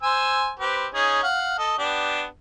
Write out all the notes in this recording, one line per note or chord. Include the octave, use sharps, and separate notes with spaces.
C5 G#5 E6
C4 G4 B4
C#4 D#4 G#4
F5 F#5
A4 D#5
B3 D4 G4